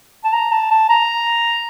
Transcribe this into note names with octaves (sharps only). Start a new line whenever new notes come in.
A5
A#5
A5
A5
A#5